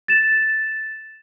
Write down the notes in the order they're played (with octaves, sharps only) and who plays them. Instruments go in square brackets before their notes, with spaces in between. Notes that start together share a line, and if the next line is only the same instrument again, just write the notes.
[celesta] A6 E7